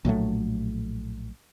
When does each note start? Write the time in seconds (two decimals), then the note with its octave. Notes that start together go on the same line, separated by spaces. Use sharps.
0.05 A#1 A2 F#3 A3